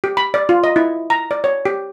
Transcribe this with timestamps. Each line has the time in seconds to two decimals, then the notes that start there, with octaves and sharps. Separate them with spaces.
0.04 G4
0.17 B5
0.34 D5
0.49 F4
0.64 D#5
0.76 E4
1.10 A#5
1.31 D5
1.44 C#5
1.65 G4